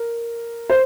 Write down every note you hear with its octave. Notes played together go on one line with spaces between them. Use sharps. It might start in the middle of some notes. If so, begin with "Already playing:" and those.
Already playing: A#4
C5